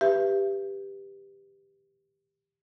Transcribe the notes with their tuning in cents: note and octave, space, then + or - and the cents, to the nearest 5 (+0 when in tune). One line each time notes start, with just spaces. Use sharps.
G4 +10 B4 +0 E5 +30